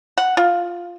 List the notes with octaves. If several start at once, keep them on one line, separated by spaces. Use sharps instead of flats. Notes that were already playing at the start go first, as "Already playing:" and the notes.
F#5
F4